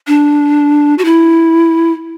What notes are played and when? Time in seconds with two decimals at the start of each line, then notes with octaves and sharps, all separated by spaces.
0.07 D4
0.98 F#4
1.05 E4